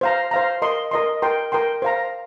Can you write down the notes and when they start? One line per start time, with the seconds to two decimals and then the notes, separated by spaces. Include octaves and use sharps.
0.01 C5 F5 A#5
0.31 C5 F5 A#5
0.62 A#4 D#5 C6
0.91 A#4 D#5 C6
1.22 A#4 G5 C6
1.52 A#4 G5 C6
1.82 C5 F5 A#5